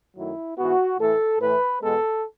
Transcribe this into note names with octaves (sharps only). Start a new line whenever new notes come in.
F#2 D#3 F#3 A3 E4
G#2 E3 B3 F#4
A2 E3 A3 A4
A2 E3 A3 B4
E2 B2 G#3 B3 A4